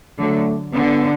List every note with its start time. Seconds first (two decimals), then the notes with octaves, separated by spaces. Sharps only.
0.19 D3 F#3 A3
0.73 D3 B3